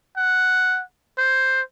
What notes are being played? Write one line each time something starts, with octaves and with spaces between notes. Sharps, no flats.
F#5
C5